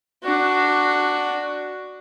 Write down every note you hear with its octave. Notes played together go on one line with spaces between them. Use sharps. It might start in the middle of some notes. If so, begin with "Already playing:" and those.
D4 F#4